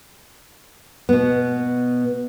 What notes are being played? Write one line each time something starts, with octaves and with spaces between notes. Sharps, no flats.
B2 B3